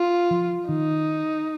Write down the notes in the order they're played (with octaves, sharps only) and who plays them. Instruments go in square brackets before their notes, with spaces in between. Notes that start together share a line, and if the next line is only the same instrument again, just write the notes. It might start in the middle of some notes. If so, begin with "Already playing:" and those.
Already playing: [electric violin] F4
[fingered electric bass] F3
[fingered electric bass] D#3 [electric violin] D#4